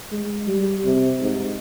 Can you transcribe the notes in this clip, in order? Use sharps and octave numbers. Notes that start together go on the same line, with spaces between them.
G#3
G3
C3
G#2